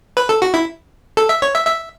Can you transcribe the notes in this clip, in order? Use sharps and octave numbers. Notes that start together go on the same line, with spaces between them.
B4
A4
F#4
E4
A4
E5
C#5
E5
E5